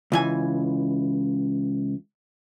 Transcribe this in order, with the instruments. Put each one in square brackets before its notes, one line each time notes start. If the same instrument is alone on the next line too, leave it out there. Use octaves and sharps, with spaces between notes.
[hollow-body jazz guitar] C#2 E3 G#5